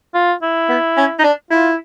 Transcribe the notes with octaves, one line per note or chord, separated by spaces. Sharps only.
F4
E4
B3
C#4
D#4
D4
E4 F4